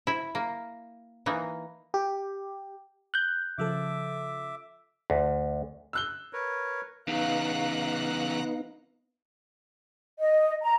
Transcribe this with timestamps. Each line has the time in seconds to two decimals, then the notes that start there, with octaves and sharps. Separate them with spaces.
0.07 E4 E5
0.35 A#3
1.26 E3 A#3 D#4
1.94 G4
3.14 F#6 G6
3.58 C#3 F3 A4 E5 D6
5.10 D2
5.93 E6 F#6 G7
6.33 A#4 B4 C#5
7.07 E2 C#3 B3 D#4 F5 F#5 A#5 F#6
10.19 D#5
10.63 A#5